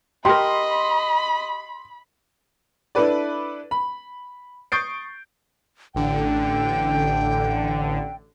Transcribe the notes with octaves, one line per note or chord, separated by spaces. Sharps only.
G4 A#4 D#5 B5 C6
D4 E4 A4 B4 D5
B5
C#6 D#6 G6 A6 C7 D7
A1 D3 G5